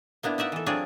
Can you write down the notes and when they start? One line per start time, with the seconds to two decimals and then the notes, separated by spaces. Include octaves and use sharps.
0.23 A#3 B3 D4 E4
0.38 D#4 D5 E5 F#5
0.52 E3 A4
0.66 F#3 C4 D4 F4 G#4 D5